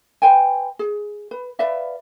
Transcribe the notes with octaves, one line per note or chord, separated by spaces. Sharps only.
B4 C5 G5 G#5
G#4
B4
B4 D5 E5 F5